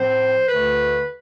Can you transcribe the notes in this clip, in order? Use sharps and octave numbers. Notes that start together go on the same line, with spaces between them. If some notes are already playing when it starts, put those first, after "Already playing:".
Already playing: A2 F3 C4 C5
D2 D3 A3 B4